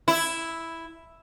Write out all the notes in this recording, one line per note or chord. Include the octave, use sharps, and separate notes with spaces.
E4